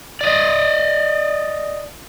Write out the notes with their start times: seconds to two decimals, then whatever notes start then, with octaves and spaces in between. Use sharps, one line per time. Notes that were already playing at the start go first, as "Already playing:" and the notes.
0.21 D5 D#5